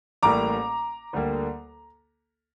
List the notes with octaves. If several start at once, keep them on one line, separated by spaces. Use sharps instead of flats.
A1 A2 G3 A#3 A#5 D6
D2 D3 G3 A#3